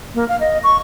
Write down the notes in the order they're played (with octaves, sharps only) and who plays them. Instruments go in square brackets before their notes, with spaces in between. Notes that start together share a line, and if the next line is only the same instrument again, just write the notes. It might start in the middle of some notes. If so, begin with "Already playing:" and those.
[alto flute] A#3
F5
D#5
C#6